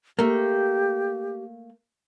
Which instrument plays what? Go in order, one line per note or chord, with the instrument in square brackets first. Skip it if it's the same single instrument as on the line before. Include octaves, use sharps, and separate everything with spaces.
[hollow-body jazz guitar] A3 A#3 [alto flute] G4